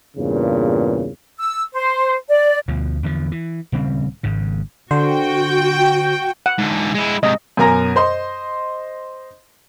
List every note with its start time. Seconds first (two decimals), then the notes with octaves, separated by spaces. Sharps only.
0.16 E2 G2 A#2 C#3
1.38 E6
1.73 C5
2.29 D5
2.68 D2 B2 F3
3.03 E2 D3 D#3 F3
3.32 E3
3.72 D#1 C#3 G3 C4
4.23 G#1 G#2 C#3
4.91 D3 F#4 C5 G5
6.46 F#5
6.58 G#2 D3
6.94 G#3 E4
7.23 G#2 C3 D#5
7.57 F#2 B2 A#4 G#5 A#5 A#6
7.96 C5 D#5 C6